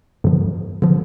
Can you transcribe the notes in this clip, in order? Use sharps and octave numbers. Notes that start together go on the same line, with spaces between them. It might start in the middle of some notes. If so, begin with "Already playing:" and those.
G2 D3 F3
D3 F3